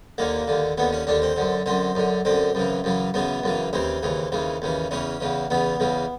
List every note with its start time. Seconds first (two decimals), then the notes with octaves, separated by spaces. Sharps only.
0.18 D#2 D3 A#3
0.48 D#2 D3
0.78 D#2 D3 B3
0.93 C#4
1.07 D#2 D3 D4
1.22 C4
1.36 F#2 D3
1.66 F#2 D3 C4
1.95 F#2 D3
2.25 F#2 D3 C4
2.55 F#2 C#3 E3
2.84 F#2 C#3 E3
3.14 F#2 C#3 E3 B3
3.43 F#2 C#3 E3
3.73 D#2 C#3 E3 C4
4.03 D#2 C#3 E3
4.32 D#2 C#3 E3
4.62 D#2 C#3 E3
4.91 E2 C#3 E3 C#4
5.21 E2 C#3 E3
5.50 E2 C#3 E3 B3
5.80 E2 C#3 E3